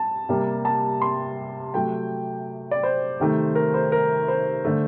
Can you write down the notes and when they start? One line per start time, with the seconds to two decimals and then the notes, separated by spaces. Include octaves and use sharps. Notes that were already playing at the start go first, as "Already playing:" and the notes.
Already playing: A5
0.29 C3 G3 A#3
0.65 A5
1.02 C6
1.74 C3 F#3 A3 G5
2.71 D5
2.83 C5
3.20 C3 D#3 A3
3.55 A#4
3.74 C5
3.92 A#4
4.28 C5
4.65 D3 A3